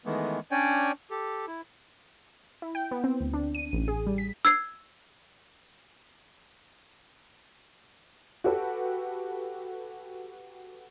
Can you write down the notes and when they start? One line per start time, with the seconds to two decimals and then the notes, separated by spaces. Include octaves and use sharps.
0.06 D#3 E3 G#3 A3 B3
0.51 C#4 D4 C#5 D5 G5 G#5
1.11 G4 A4
1.48 E4
2.62 E4
2.75 G5
2.91 B3
3.04 C4
3.21 D2
3.34 D4
3.55 D#7
3.73 A1
3.88 G#4
4.07 G3
4.18 B6
4.45 E6 G#6 C7
8.44 F#4 G4 A4 B4